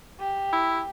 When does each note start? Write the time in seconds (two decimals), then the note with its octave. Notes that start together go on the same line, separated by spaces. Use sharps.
0.20 G4
0.52 E4